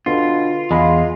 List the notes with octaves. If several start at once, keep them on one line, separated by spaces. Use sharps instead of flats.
B2 D3 F4
E2 G#3 F5 B5 C6